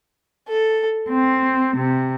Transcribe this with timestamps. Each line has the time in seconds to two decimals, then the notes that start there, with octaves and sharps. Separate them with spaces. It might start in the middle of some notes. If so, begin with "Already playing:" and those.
0.48 A4
1.08 C4
1.77 C3